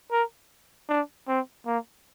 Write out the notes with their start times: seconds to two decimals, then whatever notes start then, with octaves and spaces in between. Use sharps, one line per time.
0.11 A#4
0.89 D4
1.28 C4
1.66 A#3